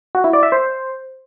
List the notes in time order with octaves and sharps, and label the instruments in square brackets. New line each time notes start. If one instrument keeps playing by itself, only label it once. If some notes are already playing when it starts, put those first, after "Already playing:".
[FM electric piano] F#4
E4
D5
E5
C5